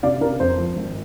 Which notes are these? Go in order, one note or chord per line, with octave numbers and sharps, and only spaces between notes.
C3 D5 F5
C3 A#4
F2 C5
F3
G#1